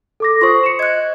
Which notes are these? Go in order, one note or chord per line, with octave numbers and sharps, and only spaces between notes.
A4 D6 A#6
F4 C5 C6 C#6 D#6
C#7 E7
D#5 F#6 G#6